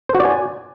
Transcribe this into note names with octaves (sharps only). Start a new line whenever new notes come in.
C5
F#4
D5
G#5